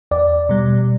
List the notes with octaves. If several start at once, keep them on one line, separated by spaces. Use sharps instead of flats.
E2 D5
B2 G3